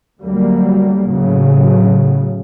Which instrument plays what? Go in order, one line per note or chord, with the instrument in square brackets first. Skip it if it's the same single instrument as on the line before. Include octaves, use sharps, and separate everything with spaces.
[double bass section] D2 F#3 G3 A#3
A2 C#3 F#3